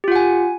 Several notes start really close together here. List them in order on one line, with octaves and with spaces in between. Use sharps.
G4 F4 F#5 G#5